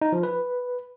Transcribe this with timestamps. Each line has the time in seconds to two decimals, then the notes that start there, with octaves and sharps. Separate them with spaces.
0.02 D#4
0.12 F3
0.23 B4